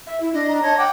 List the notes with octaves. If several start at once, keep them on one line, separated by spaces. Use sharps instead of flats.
E5
E4
D4 D#5
A#5
C#5 D#5 A5
F#5 G5 D6